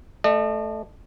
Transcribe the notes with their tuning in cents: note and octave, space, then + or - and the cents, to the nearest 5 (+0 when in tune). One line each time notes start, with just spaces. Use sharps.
A3 -10 D#5 -45